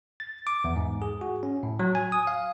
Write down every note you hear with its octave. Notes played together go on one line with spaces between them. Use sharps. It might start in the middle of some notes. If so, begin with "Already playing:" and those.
A6
D6
E2
G#2
G#4
F#4
C#4
A2
F#3
G#5
D#6
F5